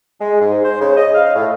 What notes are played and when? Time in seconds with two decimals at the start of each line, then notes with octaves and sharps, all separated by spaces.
0.20 G#3
0.41 G#2
0.64 C5
0.80 C#3
0.96 D#5
1.14 F5
1.35 A2